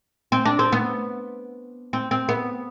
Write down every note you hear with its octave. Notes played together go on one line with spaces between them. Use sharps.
C4
D4
C4
B3
C4
C4
B3